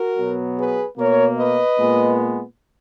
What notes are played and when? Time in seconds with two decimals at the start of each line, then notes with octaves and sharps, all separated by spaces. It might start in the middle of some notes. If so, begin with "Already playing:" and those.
Already playing: F#4 A#4
0.18 B2 F#3 B3
0.58 G#4 B4
0.98 B2 A#3 A#4 C#5
1.38 B4 D#5
1.78 A#2 G#3 B3